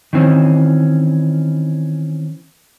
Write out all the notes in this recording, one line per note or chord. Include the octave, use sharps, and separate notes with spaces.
D#3 E3 C4 C#4